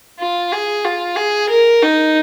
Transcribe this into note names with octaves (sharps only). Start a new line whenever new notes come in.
F4
G#4
F4
G#4
A#4
D#4